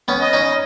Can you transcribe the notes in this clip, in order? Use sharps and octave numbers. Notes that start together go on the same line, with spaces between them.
B3 C#4
D#5
C#4 D#4